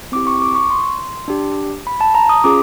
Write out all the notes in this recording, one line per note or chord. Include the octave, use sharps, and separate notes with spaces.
C4 E4 G4 D6
C#6
D6
C#6
C6
D4 G4
B5
A5
A#5
D#6
C#4 F4 G#4 D6